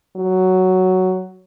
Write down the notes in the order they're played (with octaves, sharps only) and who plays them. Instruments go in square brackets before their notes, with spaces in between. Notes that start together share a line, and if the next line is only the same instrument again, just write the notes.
[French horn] F#3